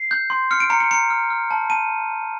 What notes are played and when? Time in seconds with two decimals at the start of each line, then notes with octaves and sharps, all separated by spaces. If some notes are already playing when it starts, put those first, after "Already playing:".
Already playing: C7
0.11 G6
0.30 C6
0.51 F6 C#7
0.60 D7
0.70 A#5 C#7
0.80 C#7
0.91 A#5 C#7
1.10 F6
1.30 F6
1.51 A5
1.70 A5 D#7